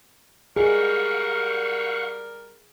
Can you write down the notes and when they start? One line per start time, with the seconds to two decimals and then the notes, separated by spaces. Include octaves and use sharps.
0.56 G3 G#4 A#4 F5 F#5 C#6